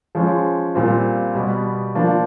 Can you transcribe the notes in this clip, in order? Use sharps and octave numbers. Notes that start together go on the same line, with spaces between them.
F3 G#3 C#4
A#2 G3 C4 F4
B2 G3 B3
F3 A#3 D4